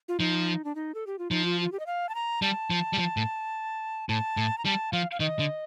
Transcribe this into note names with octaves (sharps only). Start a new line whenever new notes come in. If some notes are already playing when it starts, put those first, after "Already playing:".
F4
F3 D#4
D4
D#4
A4
G4
F4
F3 D#4
F4
F4
G4
D#5
F5
A5
A#5
G3 A5
F3
G3
F3
A2
A2 A5
A2
A#5
G3 A5
F3 F5
F5
D#3 D#5
D3